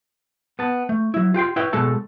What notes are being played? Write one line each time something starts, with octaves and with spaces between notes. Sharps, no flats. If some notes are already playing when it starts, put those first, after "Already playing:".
B3 A5
A3
F#3 E4
F4 G4 G5 C6
E4 B4 C#5 G5
B2 G#3 A4 C#5 A5